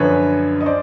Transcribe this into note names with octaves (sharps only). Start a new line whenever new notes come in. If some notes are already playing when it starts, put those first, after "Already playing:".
Already playing: F#2 D3 F3 B4 C#5
D#5
C5 D5